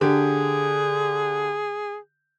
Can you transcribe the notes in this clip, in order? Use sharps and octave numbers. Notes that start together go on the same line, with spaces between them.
D3 G4 G#4